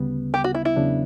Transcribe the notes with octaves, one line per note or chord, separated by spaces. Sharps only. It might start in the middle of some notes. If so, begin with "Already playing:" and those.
Already playing: D2 C#3 G3 B3
G4
F#4
E4
E4
E2 C#3 F#3 B3 D4